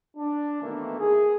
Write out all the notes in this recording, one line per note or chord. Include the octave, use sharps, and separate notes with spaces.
D4
B2 D#3 E3 A3 A#3
G#4